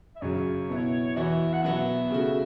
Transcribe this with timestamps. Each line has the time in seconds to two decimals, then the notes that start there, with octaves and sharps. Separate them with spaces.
0.16 E5
0.22 F#2 C#3 F#3 C#5
0.69 B2 B3 E4
1.16 E2 E3 B3 F#4 E5
1.53 F#5
1.63 B2 F#3 B3 F#4 E5
2.10 C#3 A3 F#4